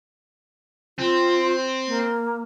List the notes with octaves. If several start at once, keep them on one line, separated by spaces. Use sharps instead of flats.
C4 F4
A#3